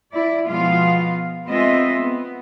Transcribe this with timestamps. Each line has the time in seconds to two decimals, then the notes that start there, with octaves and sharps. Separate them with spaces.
0.11 E4 D5
0.47 B2 F3 G#3 B3 F4 F5
1.47 G#3 B3 C4 F4 D#5 E5
2.00 B3